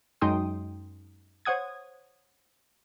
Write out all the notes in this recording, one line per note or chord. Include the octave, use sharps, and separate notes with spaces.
F#2 G#3 D#4 G5 C6 D#6
C5 C#5 F#5 D#6 G#6